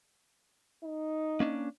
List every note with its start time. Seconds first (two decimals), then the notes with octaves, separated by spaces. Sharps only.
0.84 D#4
1.40 A#3 C#4 D4